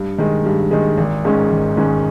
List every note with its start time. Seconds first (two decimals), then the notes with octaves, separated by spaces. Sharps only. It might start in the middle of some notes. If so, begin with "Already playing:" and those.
Already playing: G2
0.18 D#3 G#3
0.46 G2
0.71 D#3 G#3
0.98 G#1
1.25 G#2 D#3 G#3 C#4
1.50 G#1
1.77 G#2 D#3 G#3 C#4